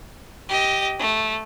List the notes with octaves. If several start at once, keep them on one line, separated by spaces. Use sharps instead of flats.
G4 D#5
A3